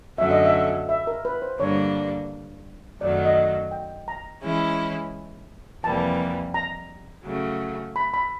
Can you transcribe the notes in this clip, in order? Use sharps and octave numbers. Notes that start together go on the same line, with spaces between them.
F#2 D3 F#3 A3 C#4 E5
D#5
E5
E5
A#4
B4
C5
G2 D3 G3 A#3 D4 C#5
F#2 D#3 F#3 A3 D5
D#5
G5
A#5
E3 G#3 C#4 E4
F2 C3 E3 G3 A#3 A5
A#5
C#3 F#3 A3
B5
B5